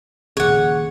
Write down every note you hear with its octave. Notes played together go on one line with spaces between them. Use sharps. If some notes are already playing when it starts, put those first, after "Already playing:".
A#1 D#2 C#3 G#4 C#5 F#5